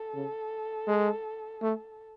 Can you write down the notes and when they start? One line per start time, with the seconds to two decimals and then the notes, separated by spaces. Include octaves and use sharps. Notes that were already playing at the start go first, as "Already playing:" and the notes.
Already playing: A4
0.14 C#3
0.87 G#3
1.62 A3